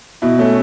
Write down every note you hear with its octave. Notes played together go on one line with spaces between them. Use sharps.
B2 E4
A3 C#4